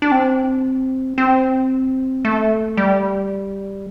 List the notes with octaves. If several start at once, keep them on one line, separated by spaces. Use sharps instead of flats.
D4
C4
C4
A3
G3